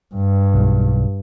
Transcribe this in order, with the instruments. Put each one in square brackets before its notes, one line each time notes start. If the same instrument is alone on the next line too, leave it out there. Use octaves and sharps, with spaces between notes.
[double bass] G2
[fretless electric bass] B1